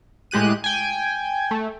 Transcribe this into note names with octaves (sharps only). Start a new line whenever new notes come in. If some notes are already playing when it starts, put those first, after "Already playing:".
A2 G#3 G4 F#6 D#7
G5 G#5
A3